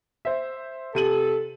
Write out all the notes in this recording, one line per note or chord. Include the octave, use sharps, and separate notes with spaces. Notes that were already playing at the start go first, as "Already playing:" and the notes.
C5 E5
C3 A4 D#7 F#7